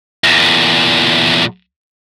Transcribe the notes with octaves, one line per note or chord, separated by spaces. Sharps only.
E2 A#2